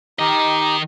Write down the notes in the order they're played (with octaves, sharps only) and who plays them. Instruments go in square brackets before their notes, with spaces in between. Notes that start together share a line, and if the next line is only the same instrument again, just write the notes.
[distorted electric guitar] D#3 D#5 [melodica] D#4 G4